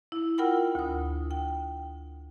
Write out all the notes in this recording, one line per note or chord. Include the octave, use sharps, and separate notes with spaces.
E4
F4 A#4 F#5 G5 B5 E6
D2 D#6
G5